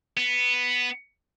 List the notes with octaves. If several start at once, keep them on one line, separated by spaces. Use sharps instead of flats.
B3